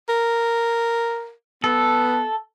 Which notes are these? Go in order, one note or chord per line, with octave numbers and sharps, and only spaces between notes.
A#4
B3 A4